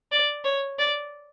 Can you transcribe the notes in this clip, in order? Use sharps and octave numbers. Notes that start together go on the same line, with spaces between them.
D5
C#5
D5